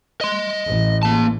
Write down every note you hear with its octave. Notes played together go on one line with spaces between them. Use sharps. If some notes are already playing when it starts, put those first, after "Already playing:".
D#5 C6
A1
A#3 A5